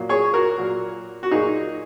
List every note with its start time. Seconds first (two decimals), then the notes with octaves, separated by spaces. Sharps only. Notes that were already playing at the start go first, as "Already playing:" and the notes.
Already playing: A#2 F#3 A#3
0.09 G#4 C#5
0.34 F#4 A#4
0.58 A#2 F#3 A#3
1.23 F#4
1.31 A#2 F#3 A#3 D#4 G#4